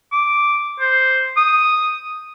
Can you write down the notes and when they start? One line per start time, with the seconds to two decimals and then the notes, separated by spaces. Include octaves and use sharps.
0.12 D6
0.80 C5
1.37 D#6